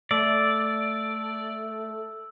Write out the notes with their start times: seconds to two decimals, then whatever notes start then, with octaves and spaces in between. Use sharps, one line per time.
0.11 A3 D5 E6